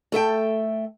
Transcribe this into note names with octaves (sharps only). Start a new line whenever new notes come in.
A3 A4 E5 G5